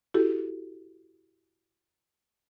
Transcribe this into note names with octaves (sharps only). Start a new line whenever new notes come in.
E4 F#4 G4 A4